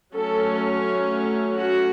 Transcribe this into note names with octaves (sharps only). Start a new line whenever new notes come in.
F#3 A3 C#4 A4
F#4